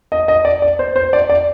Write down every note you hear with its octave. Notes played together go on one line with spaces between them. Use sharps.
D#5
D#5
D5
D5
C5
C5
D5
D5